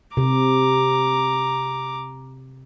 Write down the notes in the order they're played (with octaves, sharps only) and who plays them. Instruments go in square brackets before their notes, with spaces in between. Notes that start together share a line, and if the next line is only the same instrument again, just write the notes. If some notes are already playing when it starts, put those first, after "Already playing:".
[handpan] C3 [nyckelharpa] A#5 D6